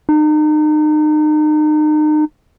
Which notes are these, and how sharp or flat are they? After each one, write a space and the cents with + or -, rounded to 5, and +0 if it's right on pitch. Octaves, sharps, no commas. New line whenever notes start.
D#4 -35